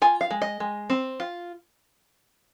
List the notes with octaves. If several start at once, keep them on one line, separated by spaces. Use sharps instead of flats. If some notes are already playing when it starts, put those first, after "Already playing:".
F4 G#5
F5
G#3
D#5
G#3
C4
F4